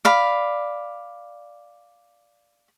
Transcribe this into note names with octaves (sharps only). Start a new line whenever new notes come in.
D5 F5 B5